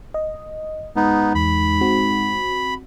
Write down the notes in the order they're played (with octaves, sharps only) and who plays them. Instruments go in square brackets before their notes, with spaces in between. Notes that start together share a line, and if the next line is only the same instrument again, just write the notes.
[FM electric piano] D#5
[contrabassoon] G#2 [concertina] B3 D#4
[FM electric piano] E2 [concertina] B5
[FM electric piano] C4 F#4